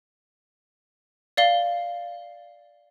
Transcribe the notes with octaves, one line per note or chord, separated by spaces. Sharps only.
D5 F5 G7